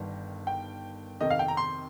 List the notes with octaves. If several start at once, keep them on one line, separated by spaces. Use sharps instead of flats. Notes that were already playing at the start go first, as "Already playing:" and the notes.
Already playing: G1 G2 D#3 G3
G5
F2 C3 D#3 D#5
F5
G5
A#5
C6